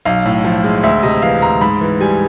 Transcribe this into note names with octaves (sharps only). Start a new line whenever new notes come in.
B1 F5
A2
F3
G#3
D2 E5
C3 D#5
E3 F5
D2 A#5
G#2 B5
E3
G3 G#5